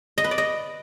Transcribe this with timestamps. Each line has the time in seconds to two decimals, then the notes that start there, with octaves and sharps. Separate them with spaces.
0.18 D#5
0.24 B4
0.31 D5
0.38 D#5